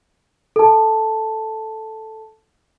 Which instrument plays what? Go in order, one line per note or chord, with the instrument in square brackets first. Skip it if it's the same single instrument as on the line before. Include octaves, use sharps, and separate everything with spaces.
[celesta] A4 A5